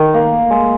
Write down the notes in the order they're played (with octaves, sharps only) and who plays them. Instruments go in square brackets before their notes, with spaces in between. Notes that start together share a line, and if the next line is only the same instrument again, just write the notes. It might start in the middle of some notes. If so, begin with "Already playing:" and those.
Already playing: [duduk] D#3
[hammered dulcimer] A#3
G#3